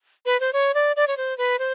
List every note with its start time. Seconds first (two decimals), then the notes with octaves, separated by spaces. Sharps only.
0.26 B4
0.40 C5
0.53 C#5
0.74 D5
0.96 D5
1.07 C#5
1.17 C5
1.38 B4
1.59 C5